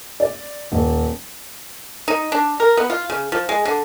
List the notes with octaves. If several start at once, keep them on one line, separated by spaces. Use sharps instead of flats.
D5
D#1
D#4
D4
A#4
B3
F4
C#3
F3
G#3
D3